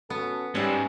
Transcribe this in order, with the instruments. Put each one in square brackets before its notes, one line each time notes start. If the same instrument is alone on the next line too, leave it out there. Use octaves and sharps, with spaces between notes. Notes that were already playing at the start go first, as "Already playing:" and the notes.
[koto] B3 [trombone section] C#4 F#4 A4
[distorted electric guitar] G#2 [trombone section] G3 [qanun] C#4 E5 F#5